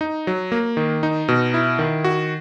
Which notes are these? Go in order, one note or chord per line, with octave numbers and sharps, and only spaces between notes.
D#4
F#3
A#3
D#3
D#4
B2
E4
D#3
F#4